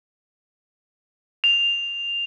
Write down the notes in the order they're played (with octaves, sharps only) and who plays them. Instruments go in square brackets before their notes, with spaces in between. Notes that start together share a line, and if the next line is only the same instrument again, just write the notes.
[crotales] F7